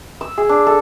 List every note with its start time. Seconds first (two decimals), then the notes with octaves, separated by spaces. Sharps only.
0.21 E6
0.38 G#4
0.49 D4
0.67 A4